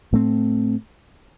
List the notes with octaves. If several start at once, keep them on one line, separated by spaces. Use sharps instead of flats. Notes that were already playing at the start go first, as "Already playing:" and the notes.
A2 A3 C4